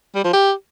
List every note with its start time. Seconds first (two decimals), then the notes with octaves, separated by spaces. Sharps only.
0.15 G3
0.24 F3
0.33 G4